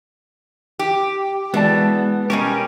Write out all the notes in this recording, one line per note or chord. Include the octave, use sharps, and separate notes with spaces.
G4
E3 G#3 B3 F#4 D5 A5
B2 G3 C#4 G4 A#4 G#5